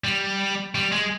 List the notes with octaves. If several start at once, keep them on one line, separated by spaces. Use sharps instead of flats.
G3
G3
G#3